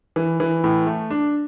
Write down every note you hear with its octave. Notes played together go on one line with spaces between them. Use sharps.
E3
E3
A2
A3
D4